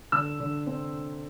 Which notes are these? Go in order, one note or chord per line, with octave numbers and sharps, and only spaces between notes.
D3 E6
D3
C4